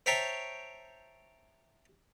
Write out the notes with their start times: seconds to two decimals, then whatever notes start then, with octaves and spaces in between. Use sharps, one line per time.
0.06 C5 C#5 E5 G5 A5 A#5